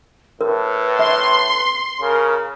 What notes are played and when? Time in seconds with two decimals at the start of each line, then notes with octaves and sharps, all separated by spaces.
0.41 A2 A#4 B4
0.99 E5 C6
2.01 C#3 A#4